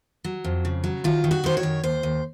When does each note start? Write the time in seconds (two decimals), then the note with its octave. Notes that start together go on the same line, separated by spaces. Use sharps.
0.24 F#3
0.44 F2
0.65 C#3
0.84 F#3
1.04 D#3 F4
1.24 D#3
1.31 F#4
1.44 D#3 C5
1.57 C#5
1.63 F#2
1.84 D#2 C5
2.03 D#2